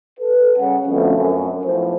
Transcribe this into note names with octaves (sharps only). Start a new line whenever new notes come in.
A4 B4
C#3 G3 C#4 F#5
B2 D3 F3 A3 C4 C#4
F#2
B1 A2 F3 C5